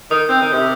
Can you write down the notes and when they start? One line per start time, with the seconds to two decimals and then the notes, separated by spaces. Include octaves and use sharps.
0.11 D#3 D#6
0.29 C4 G6
0.41 D#3
0.53 C3